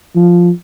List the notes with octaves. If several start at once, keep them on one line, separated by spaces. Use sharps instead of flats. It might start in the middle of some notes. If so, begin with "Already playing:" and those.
F3